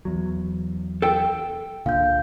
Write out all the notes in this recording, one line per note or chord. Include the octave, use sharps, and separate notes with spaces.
E2 F#3
A4 G5
C#2 A#2 D3 F5 G6